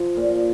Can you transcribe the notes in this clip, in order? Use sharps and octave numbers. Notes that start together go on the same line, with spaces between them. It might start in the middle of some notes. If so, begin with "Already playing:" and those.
Already playing: F3
A#2